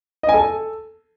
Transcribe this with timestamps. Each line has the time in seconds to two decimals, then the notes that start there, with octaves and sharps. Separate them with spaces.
0.23 D#5
0.29 G#5
0.34 A4